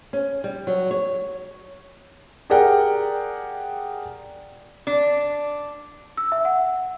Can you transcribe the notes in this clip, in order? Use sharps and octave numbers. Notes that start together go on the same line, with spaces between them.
C#4
G3
F#3
C#5
G4 G#4 A#4 D5 F#5 G5
D4
E6
E5
F#5